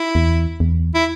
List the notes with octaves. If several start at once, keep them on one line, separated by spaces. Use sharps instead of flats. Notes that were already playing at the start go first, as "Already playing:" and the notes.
Already playing: E4
E2
E2
E4